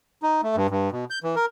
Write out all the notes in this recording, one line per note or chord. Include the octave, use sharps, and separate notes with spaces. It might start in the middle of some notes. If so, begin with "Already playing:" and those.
D#4
A3
G2
G2
B2
G6
E3
A#4